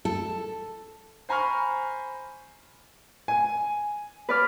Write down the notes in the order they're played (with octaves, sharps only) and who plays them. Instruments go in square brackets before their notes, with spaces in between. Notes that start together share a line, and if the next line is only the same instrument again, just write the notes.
[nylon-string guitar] A4
[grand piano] C5 G#5 A#5 B5 C#6 F6
[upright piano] G#5
[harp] B4 D5 F6